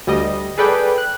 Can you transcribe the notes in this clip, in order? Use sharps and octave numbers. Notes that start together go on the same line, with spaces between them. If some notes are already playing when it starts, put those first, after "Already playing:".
D2 G3 D#5
G#4 A4 B4 D5 G5
F#6